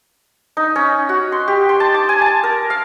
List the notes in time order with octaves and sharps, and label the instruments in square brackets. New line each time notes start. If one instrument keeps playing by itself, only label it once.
[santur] D#4
C#4
F#4
C6
G4
C6
A5
D6
G#5
A5
A#4
F5